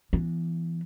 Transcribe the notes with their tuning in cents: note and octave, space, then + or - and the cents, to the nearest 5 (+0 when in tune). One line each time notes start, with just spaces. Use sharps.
E3 +25 B3 +0